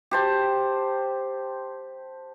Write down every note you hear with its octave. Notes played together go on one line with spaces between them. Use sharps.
G4 C5 A5